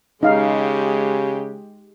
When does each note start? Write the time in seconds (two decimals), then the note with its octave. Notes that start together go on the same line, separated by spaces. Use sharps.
0.23 C#3 G#3 D#4 G4 F5